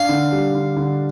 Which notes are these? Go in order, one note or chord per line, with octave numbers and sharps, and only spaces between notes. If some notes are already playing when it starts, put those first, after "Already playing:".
Already playing: D4 F5
D3
G3
D3
D3